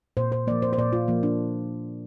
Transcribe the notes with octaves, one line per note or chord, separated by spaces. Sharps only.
A#2 C5
C5
F3 A#3 D5
C5
C5
A#2 D5
F4
F3 A#3
D4